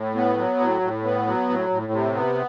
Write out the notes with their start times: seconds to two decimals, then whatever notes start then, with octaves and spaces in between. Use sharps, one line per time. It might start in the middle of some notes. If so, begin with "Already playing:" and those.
Already playing: A2
0.15 B3
0.37 F#3
0.60 A2
0.82 A2
1.04 B3
1.27 F#3
1.49 A2
1.70 A2
1.92 C3
2.14 B3